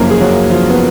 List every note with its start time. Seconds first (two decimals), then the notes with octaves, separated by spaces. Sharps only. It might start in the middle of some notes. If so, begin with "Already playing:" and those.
Already playing: F#1 F#2 C#3 F3 A#3 A#4
0.11 G#4
0.21 F#3 F#4
0.50 F3 F4
0.70 B3